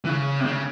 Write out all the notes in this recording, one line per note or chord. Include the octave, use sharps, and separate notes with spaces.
E3
C#3
C3
C#3